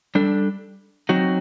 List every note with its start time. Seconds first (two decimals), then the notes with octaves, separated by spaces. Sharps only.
0.15 G3 D4 A4
1.09 F#3 C4 D#4 F#4